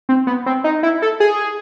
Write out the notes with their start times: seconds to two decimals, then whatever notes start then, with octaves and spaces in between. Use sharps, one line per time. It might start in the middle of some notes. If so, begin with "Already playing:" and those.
0.09 C4
0.27 B3
0.46 C4
0.64 D#4
0.83 E4
1.02 A4
1.20 G#4